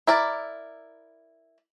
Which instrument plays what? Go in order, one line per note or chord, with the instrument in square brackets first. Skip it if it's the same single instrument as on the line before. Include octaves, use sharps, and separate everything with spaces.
[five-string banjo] E4 A#4 D5